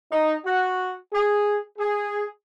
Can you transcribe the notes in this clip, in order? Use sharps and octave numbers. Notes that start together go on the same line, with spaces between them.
D#4
F#4
G#4
G#4